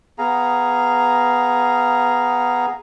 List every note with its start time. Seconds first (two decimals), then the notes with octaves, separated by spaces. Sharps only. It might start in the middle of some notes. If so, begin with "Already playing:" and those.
0.18 B3 G#4 F5 A#5